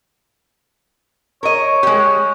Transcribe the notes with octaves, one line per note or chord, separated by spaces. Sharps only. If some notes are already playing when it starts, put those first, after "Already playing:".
A#4 C#5 D#5
G#3 G4